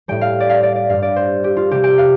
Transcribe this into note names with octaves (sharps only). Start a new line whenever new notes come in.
A2 G3 G5
F5
D5
F5
D5
D5
G2 G3 F5
D5
C5
G4
F4
C3 G3 G4
G5
F5